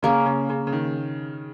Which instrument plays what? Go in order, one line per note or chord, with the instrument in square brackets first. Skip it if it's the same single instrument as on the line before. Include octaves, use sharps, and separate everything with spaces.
[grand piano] C#3 [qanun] A#3 C#4 G#4
[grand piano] C#3
C#3
C#3
D#3